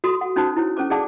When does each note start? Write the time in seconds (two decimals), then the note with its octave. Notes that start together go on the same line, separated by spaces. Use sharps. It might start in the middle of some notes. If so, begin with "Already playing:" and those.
0.04 F#4 A4 C6 D#6
0.21 F#5
0.36 C#4 D#4 F#4 C5 A5 D#6
0.56 E4 C5 C#5
0.77 C#4 A4 C5 D6
0.90 G#4 A4 D5 F#5 A5 D6